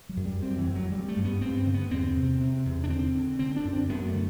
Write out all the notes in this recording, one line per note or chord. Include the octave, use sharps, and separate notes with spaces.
F#3
F#2
G3
F#2 C4
E3
F#2
F#3
G2 G3
A3
G2
B3
G2 C4
C4
D3
B3
E2 C4
C3
C3
E2
D4
D3 C4
D3
D3 C4
D4
F#2
C4
F#2 B3
A3
D3